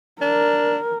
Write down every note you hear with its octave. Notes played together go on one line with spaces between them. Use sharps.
D4 A#4